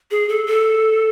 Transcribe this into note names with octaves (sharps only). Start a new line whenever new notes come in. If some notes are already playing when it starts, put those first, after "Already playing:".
G#4
A4
A4